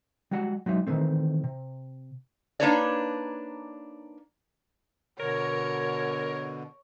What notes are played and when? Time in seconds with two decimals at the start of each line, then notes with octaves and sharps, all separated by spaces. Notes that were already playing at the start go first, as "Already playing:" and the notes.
0.31 G3 G#3 F#4 F#5
0.66 F#3 G#3 D#4 E5
0.87 D#3 E3 A3 C4
1.44 C3
2.60 A#3 D4 D#4 B4 C#5 D5
5.19 B2 D3 A#4 C#5